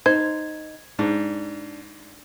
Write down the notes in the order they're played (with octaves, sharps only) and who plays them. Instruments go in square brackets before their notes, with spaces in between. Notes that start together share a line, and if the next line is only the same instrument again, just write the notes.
[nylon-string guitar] D#4 [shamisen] C5 [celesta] G#6
[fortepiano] G#2 [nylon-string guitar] D4